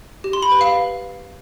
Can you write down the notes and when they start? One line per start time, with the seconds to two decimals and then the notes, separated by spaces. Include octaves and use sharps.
0.24 G4
0.33 C6
0.42 B5
0.52 B4
0.61 F5